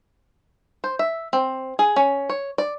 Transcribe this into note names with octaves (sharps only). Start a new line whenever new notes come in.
C5
E5
C4
G#4
C#4
C#5
D5